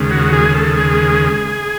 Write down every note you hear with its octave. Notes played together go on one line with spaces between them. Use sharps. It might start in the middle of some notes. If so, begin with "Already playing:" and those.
Already playing: D#2 C#3 G#3
F#4
G#4
A4
G#4